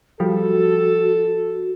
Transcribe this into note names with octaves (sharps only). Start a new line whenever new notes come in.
F3 G3 F#4 A4